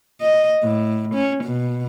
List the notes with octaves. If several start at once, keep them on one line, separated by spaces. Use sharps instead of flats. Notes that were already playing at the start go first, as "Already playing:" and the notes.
D#5
A2
C#4
B2